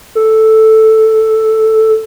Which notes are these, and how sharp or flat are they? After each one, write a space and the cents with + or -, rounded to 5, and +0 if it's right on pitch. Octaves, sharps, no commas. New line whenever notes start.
A4 +0